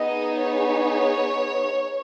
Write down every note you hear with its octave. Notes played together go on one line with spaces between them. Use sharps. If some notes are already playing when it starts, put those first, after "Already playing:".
Already playing: B3 D#4 G#4 D#5
C#5